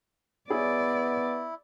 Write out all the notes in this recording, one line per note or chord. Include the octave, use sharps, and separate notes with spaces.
B3 E4 G#4 C#5 D5